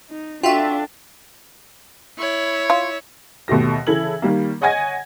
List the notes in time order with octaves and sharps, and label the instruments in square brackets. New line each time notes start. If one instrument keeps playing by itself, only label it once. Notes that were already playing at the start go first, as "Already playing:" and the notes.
[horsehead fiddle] D#4
[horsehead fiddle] D4 A4 [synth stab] F4 F#4 E5 [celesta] F5 G5
[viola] E4 C#5
[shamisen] F4
[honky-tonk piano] D#2 B2 A3 G4 A#6
C#3 E3 E4 A4 G#6 F#7
D#3 G3 A#3
C#5 D#5 F#5 G#5 G#6 A#6